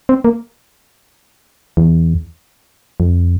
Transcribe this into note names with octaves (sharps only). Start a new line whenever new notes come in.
C4
A#3
E2
F2